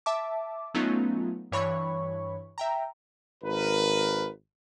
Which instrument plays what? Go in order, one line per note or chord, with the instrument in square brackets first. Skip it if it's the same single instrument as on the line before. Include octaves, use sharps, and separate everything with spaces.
[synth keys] E5 A5 D6
F#3 A3 B3 C#4 D#4 F4
G2 E3 C#5 B5 C#6
E5 G5 A#5
[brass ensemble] G#1 A#4 B4